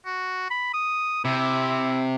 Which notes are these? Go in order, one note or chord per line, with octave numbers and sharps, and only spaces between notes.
F#4
B5
D#6
C3 E4